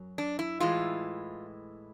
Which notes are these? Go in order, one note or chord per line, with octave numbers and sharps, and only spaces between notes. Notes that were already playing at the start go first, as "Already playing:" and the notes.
Already playing: F#2 F#3
D4
E4
A2 E3 G#3 F4